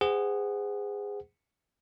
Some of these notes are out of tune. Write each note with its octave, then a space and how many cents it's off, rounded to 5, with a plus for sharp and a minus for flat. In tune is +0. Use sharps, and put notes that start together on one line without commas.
G#4 -20 C5 -35 F#5 +10